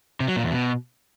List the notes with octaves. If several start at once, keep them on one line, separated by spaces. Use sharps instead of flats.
C3
F#3
A#2
E2
B2